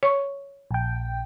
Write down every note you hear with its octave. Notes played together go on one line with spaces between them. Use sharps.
C#5 C#6
A#1 G5